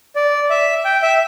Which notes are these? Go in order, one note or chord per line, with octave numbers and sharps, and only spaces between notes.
D5
E5
G5
E5